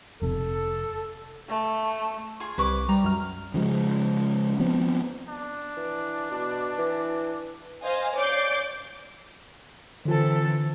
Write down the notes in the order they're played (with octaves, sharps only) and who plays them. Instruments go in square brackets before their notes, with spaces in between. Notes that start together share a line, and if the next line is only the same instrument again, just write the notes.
[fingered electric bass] F1 C3 [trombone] A4
[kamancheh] A3
[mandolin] F4 G#4 C#6
[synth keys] C2 [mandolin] B4 C#6 D6
[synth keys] G3 [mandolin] A#5
[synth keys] F#2 F6
[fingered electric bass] C#3 F3 G#3
F3 B3 C4
[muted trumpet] D4
[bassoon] E3
B2
E3
[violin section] C5 D#5 F5 G#5
C#5 D5 D6 G6 C7 D7
[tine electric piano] D3 F4 [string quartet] E3 C4 A4